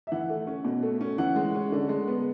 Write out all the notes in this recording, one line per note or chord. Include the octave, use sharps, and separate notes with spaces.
E5
E3 F#5
A3
C#4
B2
A3
C#4
E3 F#5
G#3
C#4
D3
G#3
B3